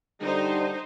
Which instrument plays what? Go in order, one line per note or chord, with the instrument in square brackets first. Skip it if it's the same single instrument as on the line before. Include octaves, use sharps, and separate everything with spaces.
[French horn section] D3 G3 [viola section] D#4 C5